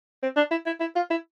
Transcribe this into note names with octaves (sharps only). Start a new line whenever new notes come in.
C4
D4
E4
E4
E4
F4
E4